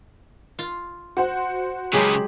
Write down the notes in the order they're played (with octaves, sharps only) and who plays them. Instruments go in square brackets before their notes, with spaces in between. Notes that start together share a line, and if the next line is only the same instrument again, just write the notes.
[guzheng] F4
[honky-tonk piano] F#4 C5 F#5
[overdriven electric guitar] C#3 B4 [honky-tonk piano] F#3 F#7 [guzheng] G#3 G4 G#4